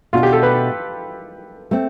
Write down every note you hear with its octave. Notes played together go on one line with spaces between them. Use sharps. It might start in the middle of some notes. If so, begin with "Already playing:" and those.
B2 A3 D4 F4
G4
A4
B4
A3 C4